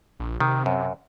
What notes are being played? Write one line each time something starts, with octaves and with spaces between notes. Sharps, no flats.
A#1
C3 D#3
F#2